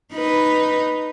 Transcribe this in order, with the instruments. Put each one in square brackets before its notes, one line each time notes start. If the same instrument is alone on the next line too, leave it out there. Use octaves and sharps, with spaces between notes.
[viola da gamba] D#4 B4